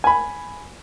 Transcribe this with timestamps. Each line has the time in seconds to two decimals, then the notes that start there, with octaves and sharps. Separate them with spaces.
0.04 G#5 B5